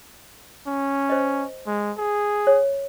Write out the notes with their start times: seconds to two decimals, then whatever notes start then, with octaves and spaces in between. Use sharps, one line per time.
0.68 C#4
1.09 C5 D#5
1.67 G#3
1.98 G#4
2.47 C#5